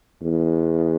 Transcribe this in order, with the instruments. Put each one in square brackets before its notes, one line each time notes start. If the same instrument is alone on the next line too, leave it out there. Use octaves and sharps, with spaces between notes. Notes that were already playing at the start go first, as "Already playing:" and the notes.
[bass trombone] E2